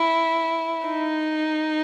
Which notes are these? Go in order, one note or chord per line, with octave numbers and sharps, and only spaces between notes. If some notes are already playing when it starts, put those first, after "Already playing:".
Already playing: E4
D#4